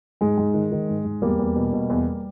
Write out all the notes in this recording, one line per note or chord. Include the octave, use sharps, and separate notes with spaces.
G#2 G#3
G#2
D#3
D#3
G#2
G#2
E2 G3 A#3
E2
B2
B2
E2